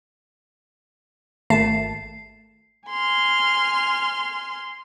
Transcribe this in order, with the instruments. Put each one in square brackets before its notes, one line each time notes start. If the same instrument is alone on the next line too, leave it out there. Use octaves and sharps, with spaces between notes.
[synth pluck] G#1 A3 A5 [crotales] C7
[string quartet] G#5 C6 F6